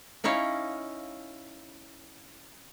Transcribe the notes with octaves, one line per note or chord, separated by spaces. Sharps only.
C#4 D#4 E4 C#5 F5